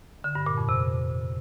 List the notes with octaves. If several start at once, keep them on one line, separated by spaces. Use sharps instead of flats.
D3
G2
A#2
F2
C3